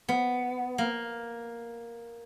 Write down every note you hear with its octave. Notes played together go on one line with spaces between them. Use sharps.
B3
A#3